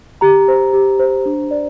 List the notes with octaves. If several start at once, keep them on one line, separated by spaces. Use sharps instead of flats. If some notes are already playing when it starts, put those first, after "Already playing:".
G4 A#5
C5
G4
C5
D4
D5